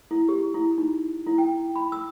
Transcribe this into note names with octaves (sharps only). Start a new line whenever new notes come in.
E4
G4
E4
D#4
E4
G5
B5
E6